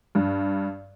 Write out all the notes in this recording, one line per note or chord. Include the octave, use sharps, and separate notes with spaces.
G2